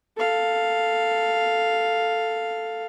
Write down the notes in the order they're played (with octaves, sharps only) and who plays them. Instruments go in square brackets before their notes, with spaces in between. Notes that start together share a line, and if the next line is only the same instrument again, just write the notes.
[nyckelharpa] A4 F5